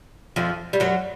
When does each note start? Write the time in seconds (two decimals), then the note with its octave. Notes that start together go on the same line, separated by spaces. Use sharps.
0.36 F2 F3
0.73 G3
0.80 F#2 F#3